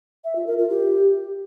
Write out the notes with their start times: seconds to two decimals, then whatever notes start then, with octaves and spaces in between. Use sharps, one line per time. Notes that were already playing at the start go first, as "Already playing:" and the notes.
0.24 E5
0.36 F4
0.47 A#4
0.58 F4
0.69 G4